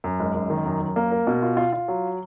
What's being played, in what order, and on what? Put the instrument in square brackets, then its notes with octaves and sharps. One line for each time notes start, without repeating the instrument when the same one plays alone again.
[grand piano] F#2
G#1
F#2
D#3
F#2
F#2
A#3
A#4
B2
F4
F4
F4
F#3